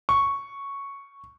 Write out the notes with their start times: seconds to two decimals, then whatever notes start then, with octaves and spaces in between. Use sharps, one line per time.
0.09 C#6